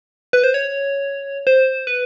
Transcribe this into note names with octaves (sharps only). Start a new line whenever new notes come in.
B4
C5
C#5
C5
B4